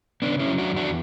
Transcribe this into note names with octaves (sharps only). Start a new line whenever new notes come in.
C#3 B3 D4
C#4 E4
F#3
D4 F#4
E2
D4 F#4